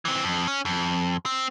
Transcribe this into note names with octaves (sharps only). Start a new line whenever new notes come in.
E3 C4
F2
C#4
F2
C4